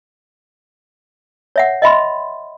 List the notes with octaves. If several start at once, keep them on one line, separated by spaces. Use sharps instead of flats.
C#5 E5 F#5
D#5 E5 B5 C6